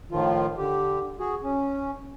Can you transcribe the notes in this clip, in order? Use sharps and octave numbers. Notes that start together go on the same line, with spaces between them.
A2 D#3 F3 F4
D3 G4
F#4 G#4
C#4